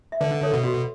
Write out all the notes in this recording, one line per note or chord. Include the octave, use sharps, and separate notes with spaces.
E5
D3 B4 D5
A4 C#5
B2
F#4